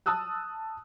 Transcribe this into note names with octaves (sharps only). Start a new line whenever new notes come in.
A5 D#6 E6 F#6